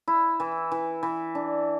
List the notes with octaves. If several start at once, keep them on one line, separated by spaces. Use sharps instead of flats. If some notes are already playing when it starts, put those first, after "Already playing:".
E4
E3
E3
E3
D4